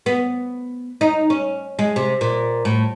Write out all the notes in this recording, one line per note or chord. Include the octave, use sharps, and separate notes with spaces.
B3
D#4
C#4
G#3
C3
A#2
A2